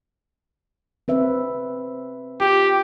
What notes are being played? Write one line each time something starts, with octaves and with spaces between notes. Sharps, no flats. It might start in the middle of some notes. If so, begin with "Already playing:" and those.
C4 B4 E5
F4 G4